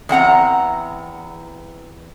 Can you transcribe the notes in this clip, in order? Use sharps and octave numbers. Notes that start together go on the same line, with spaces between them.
E2 C4 F#5 A#5